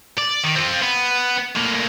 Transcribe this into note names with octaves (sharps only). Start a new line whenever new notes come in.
D5
D#3
C4 F4
B3
A2 A#3